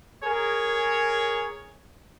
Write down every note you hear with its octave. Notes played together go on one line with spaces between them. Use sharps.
G#4 A#4 C#5